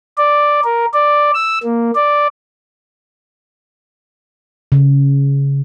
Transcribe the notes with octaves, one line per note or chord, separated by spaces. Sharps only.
D5
A#4
D5
E6
A#3
D5
C#3